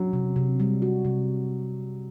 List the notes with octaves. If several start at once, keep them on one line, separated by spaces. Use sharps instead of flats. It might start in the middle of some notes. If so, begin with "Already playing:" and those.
Already playing: F#3
C3
C3
G3
F#4
C3